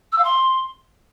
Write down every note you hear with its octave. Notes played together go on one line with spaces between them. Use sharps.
E6
F5
C6